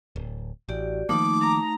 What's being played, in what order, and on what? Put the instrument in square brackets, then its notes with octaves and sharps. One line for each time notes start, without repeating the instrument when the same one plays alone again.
[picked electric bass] D1
[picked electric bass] A1 [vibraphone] F#4 G4 D5
[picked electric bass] D#3 F3 A#3 [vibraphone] A3 D#4 [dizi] D6
[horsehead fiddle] A#5